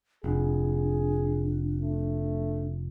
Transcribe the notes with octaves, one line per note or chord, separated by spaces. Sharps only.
F1 D4 G#4
A3